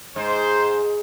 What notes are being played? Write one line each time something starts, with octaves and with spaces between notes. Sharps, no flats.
G#2 C5